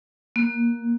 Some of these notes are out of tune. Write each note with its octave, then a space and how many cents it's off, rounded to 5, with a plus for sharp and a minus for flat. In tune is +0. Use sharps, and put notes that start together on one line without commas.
A#3 +10